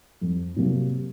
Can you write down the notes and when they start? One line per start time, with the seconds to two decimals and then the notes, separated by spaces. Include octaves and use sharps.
0.21 F2
0.57 C3 F#3 A#3